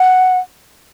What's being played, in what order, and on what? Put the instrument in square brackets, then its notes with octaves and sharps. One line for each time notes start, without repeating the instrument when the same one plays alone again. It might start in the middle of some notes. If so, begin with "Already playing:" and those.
Already playing: [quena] F#5